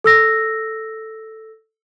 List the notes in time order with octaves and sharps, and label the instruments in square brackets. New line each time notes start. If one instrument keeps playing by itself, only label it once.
[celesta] A4 E6 A#6